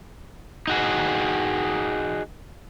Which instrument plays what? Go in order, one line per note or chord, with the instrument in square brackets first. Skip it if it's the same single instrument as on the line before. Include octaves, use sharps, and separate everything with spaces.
[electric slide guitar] D#4 F#4 G#4